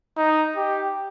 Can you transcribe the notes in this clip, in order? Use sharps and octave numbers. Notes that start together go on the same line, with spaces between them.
D#4
G4